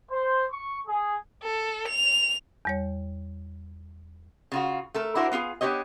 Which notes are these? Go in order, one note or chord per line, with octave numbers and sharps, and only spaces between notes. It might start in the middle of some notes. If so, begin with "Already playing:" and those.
C5
C#6
G#4
A4
F7
E2 G3 C#5
C#3 F4 F#4
A3 A4 A#4
D4 E4 F#4 A#4 C5
B3 F4 F#4 G#4
B3 D4 G4 C#5 D#5